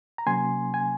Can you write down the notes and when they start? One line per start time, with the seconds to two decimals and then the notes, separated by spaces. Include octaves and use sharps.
0.18 A#5
0.26 C3 F#3 A#3 C#4 G#5 C6
0.74 G#5